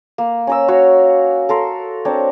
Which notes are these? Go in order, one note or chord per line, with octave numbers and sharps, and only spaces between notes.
A#3
C#4 A#4 E6
F#4 C#5 F5 E6
A4 A#4 C6
C4 D4 A#4 C#5